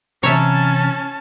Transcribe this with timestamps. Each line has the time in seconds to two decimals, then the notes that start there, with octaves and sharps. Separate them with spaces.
0.23 C3 E3 C#4 C#5 E5 A5 A#5